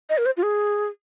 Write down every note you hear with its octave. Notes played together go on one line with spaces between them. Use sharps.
D#5
A#4
C5
F4
G#4